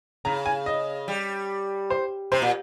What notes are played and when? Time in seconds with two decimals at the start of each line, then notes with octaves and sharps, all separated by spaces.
0.25 C#3 A#5
0.46 G#5
0.66 D#5
1.08 G3
1.90 C5
2.32 C3 C5
2.42 A#2